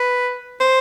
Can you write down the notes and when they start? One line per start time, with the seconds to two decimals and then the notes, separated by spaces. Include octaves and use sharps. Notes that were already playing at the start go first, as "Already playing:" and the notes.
Already playing: B4
0.61 C5